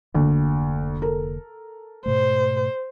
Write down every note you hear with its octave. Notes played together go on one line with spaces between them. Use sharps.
F1 D2 D3 A#3
A4 A#4
G#2 B2 A3 C5